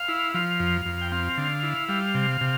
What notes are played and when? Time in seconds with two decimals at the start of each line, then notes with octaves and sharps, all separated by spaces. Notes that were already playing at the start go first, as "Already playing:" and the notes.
Already playing: F5
0.08 E4
0.34 F3 F5
0.60 F2
0.85 F2
1.01 G5
1.12 C4 F5
1.37 D3
1.63 E4
1.89 G3 F5
2.15 C3
2.41 C3